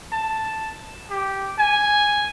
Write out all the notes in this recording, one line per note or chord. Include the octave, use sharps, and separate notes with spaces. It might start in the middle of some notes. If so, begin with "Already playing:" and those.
A5
G4
G#5